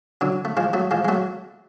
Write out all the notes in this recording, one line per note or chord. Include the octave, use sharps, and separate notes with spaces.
D3 F#3
A3
F3 G#3
F#3 A3
F3 G#3
G#3
F#3 A3